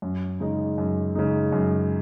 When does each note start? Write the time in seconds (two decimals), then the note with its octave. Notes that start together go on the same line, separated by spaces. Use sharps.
0.02 F#2
0.40 C#3 G#3 D#4
0.78 F#2
1.15 C#3 G#3 D#4
1.52 F#2